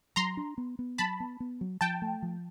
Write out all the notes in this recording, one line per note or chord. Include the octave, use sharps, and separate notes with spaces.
F#3 A#5 C6
D4
B3
B3
F#3 A5 B5
B3
B3
F#3
F3 G5 A5
A3
F3